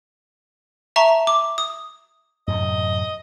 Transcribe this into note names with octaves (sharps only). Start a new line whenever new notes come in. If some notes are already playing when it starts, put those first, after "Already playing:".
E5 A5 A#5 C#6
D6
D#6
F#2 A2 C3 D#5